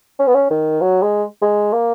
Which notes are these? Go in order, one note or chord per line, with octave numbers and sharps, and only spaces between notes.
C#4
B3
C#4
D#3
F#3
G#3
G#3
A#3